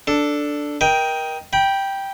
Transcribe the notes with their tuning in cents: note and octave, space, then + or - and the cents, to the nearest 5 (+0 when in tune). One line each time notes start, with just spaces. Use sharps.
D4 +0 A4 +5
A#4 +25 D#5 +15 G5 +0
G5 +0 B5 -30